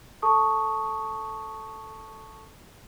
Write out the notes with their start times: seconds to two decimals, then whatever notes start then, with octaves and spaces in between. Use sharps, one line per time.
0.22 A4 A5 C#6 D#6